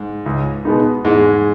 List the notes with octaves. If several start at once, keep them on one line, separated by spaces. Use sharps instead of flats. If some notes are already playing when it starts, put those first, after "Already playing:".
Already playing: G#2
C#2
B2 G#3 B3 D#4
E2 G#2 G#3